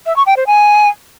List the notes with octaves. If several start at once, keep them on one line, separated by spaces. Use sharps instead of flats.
E5
C#6
G5
C5
G#5